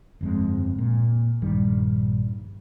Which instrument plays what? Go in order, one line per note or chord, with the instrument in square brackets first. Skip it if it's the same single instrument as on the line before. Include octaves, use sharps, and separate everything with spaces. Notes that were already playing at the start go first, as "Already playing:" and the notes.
[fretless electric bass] G1 F2 G#3
A#2
A#1 G2 D#3 G3